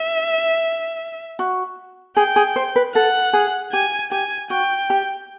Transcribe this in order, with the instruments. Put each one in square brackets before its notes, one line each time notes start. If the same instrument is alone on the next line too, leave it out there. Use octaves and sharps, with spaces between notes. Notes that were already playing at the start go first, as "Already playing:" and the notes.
Already playing: [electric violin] E5
[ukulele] F#4
[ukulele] G#4 [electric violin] G5
[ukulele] G#4
C5
B4
[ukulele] A4 [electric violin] F#5
[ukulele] G#4
[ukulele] G4 [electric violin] G#5
[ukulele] G4 [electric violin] G#5
[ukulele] F#4 [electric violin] G5
[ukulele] G4